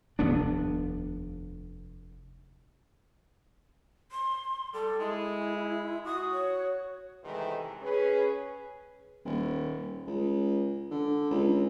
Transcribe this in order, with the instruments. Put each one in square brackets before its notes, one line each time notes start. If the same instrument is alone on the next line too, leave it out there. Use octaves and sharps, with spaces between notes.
[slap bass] F1 D#2 B3 D4
[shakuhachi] C6
[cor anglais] G3 [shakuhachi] A4
[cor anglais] G#3 [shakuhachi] E4
[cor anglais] F#4 [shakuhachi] D#6
[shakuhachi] C#5
[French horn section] C3 D#3 E3 G#3 A3 B4
C#4 G#4 B4
[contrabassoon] D#1
C#2
D3
C#2